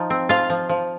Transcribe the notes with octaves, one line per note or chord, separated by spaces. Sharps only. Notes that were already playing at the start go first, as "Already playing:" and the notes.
Already playing: F3 D#4
C4
F3 F4 F5
F3
F3